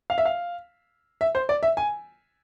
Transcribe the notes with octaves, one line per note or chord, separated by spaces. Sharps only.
F5
E5
F5
E5
C5
D5
E5
G#5